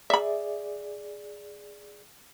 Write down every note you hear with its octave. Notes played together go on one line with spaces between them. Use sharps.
G#4 D5 E5 B5